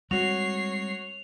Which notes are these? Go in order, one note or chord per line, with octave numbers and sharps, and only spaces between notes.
G3 G#3 C4 F#4 C#5 C7 F7